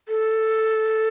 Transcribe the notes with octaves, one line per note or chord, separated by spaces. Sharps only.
A4